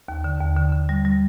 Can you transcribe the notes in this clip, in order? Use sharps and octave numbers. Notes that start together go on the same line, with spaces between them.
D#2
D3
D#2
D3
D3
G3
G3